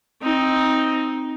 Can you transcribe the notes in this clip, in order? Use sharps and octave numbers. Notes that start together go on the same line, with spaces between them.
C4 D#4